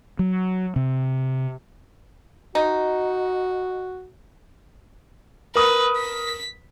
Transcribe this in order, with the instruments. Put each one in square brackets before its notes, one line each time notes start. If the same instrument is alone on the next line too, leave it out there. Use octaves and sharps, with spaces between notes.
[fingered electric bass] F#3
C3
[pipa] D#4 [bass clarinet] F#4
[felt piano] A#4 D#6 [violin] B4
[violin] B6